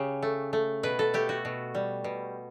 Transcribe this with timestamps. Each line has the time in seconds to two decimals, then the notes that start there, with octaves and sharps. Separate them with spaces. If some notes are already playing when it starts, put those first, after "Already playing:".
Already playing: C#3 G4 C#5
0.23 A3
0.53 A3
0.83 B2 B4
0.99 A4
1.14 A3 G4
1.29 F#4
1.45 B2
1.75 G3
2.04 B2